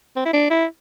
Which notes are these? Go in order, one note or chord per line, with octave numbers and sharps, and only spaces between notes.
C4
E4
D4
E4